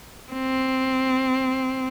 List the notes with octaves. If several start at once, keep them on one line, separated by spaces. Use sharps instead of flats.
C4